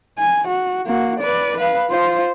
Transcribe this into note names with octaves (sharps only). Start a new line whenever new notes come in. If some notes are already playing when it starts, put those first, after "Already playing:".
G#5
F#4
A#3 F#4
B4 D5
B4 F5
F4 C5